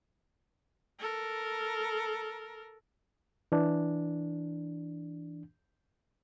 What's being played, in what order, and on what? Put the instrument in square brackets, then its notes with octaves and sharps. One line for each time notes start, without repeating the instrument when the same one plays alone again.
[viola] A4 A#4
[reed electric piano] E3 D4